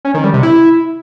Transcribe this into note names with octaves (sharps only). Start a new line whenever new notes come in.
C#4
D#3
G3
C3
E4